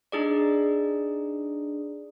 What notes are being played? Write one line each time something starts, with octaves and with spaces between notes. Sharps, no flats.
D4 D#4 G#4 D5